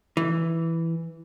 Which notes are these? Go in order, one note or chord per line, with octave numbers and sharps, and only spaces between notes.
E3